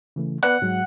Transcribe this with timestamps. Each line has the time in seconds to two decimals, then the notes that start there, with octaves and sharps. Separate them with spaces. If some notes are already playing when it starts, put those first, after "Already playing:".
0.16 C#3 E3 A3
0.43 B3 B4 D5 F#5
0.62 G#2 F#3 G#3